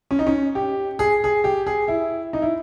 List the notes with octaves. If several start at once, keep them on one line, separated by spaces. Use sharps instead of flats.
C#4
D#4
C#4
G4
G#4
G#4
G4
G#4
E4
D#4
E4